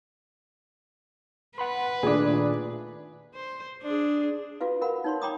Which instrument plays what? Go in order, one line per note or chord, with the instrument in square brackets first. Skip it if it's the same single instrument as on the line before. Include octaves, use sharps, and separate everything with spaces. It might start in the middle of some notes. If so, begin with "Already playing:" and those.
[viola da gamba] B4 [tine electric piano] F#5 B5 C6
[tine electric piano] A#2 D#3 A3 [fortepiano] D4 G#4
[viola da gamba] C5
D4 G#4
[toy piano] F4 F#4 B4 F5
A#4 F5 F#5 B5
D#4 C#5 C6
C#5 G5 A#5 B5 D6 D#6